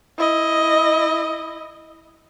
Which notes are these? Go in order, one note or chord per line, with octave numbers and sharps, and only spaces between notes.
E4 D#5